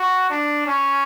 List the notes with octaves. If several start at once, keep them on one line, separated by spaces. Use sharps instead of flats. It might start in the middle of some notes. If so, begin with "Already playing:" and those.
Already playing: F#4
D4
C#4